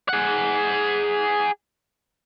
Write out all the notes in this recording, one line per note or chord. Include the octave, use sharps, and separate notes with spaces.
G#4 F#5